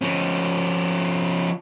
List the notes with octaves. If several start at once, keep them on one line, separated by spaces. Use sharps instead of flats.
F3 C#4